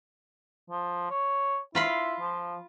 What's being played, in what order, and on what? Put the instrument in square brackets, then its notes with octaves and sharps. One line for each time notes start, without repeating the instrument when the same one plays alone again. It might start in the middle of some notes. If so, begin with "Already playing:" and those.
[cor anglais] F3
C#5
[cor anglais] E4 [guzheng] F4 B5 C6
[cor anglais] F3